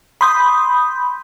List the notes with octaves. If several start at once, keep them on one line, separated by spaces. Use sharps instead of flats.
B5 C6 D#6 G6